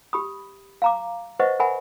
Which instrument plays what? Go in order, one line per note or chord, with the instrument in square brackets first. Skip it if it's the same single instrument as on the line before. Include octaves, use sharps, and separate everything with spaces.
[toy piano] G4 B5 D#6
F5 A#5 D6
B4 C5 D#5 E5 F#5 C#6
A#4 E5 F#5 G#5 B5